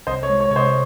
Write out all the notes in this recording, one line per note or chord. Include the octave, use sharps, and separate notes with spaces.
C2 C5 D#5
C#5
G#3
C#5
C3 C#5
C5 D#5